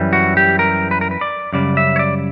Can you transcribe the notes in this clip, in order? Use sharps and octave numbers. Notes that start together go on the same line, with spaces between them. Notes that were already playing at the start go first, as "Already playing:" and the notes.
Already playing: F#2 E3 G3
F#4
G4
A#4
B4
A#4
B4
D5
F#2 C#3 G3 D5
E5
C#5
D5